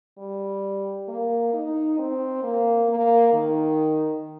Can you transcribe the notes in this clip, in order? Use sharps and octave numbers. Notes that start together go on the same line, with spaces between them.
G3
A#3
D#4
C4
A#3
A#3
D#3